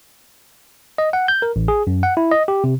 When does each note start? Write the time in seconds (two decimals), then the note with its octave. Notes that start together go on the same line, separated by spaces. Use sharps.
0.98 D#5
1.13 F#5
1.28 G6
1.42 A#4
1.56 A1
1.68 G#4
1.87 F#2
2.03 F#5
2.17 E4
2.32 D#5
2.48 G4
2.64 C3